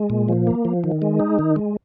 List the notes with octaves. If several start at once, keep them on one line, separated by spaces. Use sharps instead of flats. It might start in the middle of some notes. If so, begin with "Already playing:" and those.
Already playing: G#3
A#2
F3
A#3
F3
D#3
G#3
D#4
D#3
G#3